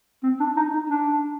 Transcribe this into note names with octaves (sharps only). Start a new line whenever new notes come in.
C4
D4
D#4
D#4
D4